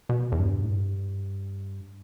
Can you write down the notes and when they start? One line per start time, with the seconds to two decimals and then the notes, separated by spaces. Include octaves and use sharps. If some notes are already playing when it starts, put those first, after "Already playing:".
0.09 B2
0.32 E2
0.39 G2
0.64 A2
0.69 G2